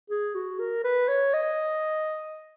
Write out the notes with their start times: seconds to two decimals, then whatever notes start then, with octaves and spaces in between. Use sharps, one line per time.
0.10 G#4
0.35 F#4
0.59 A#4
0.84 B4
1.08 C#5
1.33 D#5